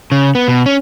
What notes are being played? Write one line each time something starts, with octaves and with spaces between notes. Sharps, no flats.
C#3
B3
B2
C#4